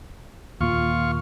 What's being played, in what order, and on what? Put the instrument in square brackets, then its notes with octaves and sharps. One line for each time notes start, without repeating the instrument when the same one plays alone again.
[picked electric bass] D#2 A#2 [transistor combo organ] F4 C#6